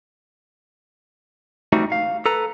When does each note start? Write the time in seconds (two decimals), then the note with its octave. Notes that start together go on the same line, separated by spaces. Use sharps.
1.73 G3 A3 C4 D#4 F#4
1.92 F5
2.26 A4 B4 A#5